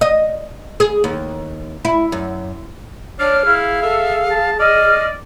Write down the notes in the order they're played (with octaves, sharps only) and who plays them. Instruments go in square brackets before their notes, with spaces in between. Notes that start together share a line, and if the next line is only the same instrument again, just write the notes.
[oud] D#5
G#4
D#2
E4
F#2
[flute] D4 [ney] C#5 [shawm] D5 [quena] F6
[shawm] E4 [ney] G#4 [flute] F5
[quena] A4 [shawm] E5
[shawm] A5
[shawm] D5 [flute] D#5 [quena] F6